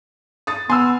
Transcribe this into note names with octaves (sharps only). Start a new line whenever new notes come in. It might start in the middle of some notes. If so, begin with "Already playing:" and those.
D#6 A6
B3 G#5 C6 E6 F6